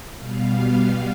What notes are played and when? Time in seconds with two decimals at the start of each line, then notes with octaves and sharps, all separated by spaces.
0.18 B2 G3 B3 F5